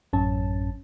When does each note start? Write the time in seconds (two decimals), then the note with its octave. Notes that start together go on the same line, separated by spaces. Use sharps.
0.13 A1 F#2 C#4 A5